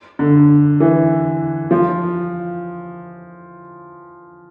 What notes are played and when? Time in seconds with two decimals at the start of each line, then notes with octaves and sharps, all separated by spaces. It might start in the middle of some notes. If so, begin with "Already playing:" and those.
0.19 D3
0.80 E3
1.71 F3